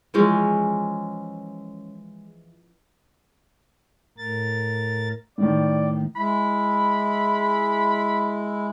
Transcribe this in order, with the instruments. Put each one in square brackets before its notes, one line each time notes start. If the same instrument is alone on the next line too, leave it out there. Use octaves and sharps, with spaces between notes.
[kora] E3 F3 G#3 C#4
[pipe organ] A2 A#4 A6
[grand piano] A2 D#3 [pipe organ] D5
[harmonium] G#3 E4 [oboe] B5